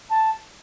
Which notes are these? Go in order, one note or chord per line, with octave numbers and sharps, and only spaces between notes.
A5